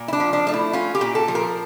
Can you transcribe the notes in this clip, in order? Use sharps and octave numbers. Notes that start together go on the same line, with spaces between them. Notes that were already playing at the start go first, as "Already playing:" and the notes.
Already playing: A#2
E4
D4
F3
D4
A3 D4
E4
C#4 F4
G4
A#2
A4
F3
A#4